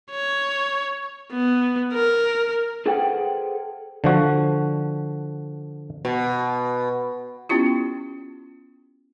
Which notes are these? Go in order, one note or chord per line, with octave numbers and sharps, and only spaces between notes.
C#5
B3
A#4
G#4 A4 B4 C5 F#5 G5
D3 F3 F#4
B2
B3 C#4 E4 F4 G4